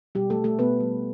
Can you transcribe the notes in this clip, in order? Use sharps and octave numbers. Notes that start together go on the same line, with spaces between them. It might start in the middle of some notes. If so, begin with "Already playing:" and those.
B2 G3 G4
A3 A4
G3
A3 A4
B2 B3 B4
G3